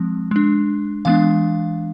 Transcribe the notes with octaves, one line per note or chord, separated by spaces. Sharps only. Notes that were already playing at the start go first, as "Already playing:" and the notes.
Already playing: F3 G#3 C4
G#3 D4
E3 G#3 B3 D4 F5